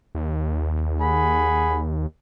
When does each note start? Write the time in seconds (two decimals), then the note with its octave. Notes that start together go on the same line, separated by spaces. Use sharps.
0.15 D#2
1.00 G#4 F#5 B5